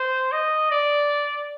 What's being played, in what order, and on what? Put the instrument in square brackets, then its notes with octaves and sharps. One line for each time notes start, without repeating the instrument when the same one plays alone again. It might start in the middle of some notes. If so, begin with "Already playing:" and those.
Already playing: [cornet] C5
D#5
D5